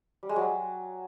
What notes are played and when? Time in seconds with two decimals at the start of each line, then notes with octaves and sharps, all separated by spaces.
0.23 G3
0.29 G#3
0.36 F#3